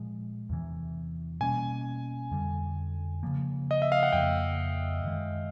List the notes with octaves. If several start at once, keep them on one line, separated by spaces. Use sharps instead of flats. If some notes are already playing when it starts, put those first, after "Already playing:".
Already playing: A#2 F3 G#3
E2 C3 E3
B2 G3 A#3 C#4 G#5
F2 D3 G3
C#3 F3 A#3
D#5
E5
F5
F#5
F2 C#3 F3 A#3 G5
F#2 D#3 G#3